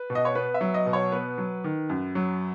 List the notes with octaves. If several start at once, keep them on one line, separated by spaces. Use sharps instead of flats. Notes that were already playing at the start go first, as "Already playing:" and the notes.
Already playing: B4
B2
D#5
C#5
B3 B4
E5
F#3
D#5
B2
C#5
B3 B4
F#3
D#3
F#2
F#3